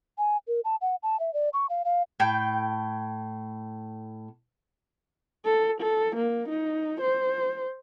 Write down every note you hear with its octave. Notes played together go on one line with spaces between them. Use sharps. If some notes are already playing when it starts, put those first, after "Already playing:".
G#5
A#4
A5
F#5
A5
E5
D5
C#6
F5
F5
A2 G5
A4
A4
A#3
D#4
C5